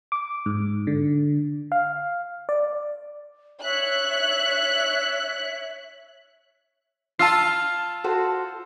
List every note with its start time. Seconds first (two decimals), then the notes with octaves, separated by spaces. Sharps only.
0.12 D6
0.46 G#2
0.87 D3
1.72 F5
2.49 D5
3.63 C#5 E5 F#6
7.19 F4 A5 E6 C7
8.04 F#4 A4 C5